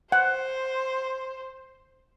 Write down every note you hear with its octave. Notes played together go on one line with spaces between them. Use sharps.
C5 F#5